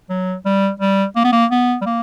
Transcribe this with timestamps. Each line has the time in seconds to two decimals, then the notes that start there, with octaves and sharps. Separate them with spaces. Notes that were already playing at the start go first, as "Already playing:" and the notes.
0.10 F#3
0.45 G3
0.80 G3
1.16 A#3
1.24 B3
1.32 A#3
1.51 B3
1.82 G3
1.86 A#3